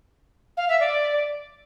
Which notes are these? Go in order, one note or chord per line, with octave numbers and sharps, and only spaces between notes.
F5
E5
D5